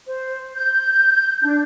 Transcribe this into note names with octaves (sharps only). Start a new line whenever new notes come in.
C5
G6
D4